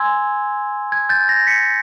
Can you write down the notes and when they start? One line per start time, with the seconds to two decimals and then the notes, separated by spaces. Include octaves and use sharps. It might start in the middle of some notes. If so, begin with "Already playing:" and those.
Already playing: G#5 C6 E6 G#6
0.92 G#6
1.09 G6 A6
1.28 G#6 A#6
1.47 B6 C#7